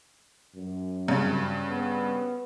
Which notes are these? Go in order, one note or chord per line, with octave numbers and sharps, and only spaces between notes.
F#2
G2 C#3 C4
B3